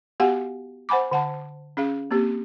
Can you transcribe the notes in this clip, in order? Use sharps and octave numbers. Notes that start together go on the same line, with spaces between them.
B3 F#4 G4 F5 F#5 G#5
C5 F#5 G#5 B5 D6
D3 F#5 A5
C#4 G#4 F5
A#3 C4 G4